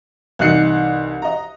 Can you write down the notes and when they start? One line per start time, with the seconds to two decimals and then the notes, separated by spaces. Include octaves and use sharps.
0.39 C2 E3 D#4 F#6 C7 C#7
1.22 D#5 A#5